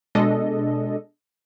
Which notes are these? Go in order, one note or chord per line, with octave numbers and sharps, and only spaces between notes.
B2 G#3 D4 A4 D#5